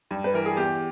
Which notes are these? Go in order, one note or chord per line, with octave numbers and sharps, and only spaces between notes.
G2
B4
E3 A#4
G#4
E2 G4